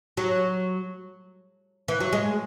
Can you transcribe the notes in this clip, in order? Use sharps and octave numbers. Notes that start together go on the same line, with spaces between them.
F#3
E3
F#3
G#3